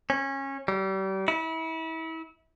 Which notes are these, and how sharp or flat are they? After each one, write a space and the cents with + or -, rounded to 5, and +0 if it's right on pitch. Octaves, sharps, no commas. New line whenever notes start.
C#4 -20
G3 -35
E4 -30